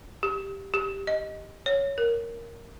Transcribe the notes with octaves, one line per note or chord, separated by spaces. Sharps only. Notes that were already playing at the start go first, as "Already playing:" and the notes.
G4
G4
D#5
C#5
A#4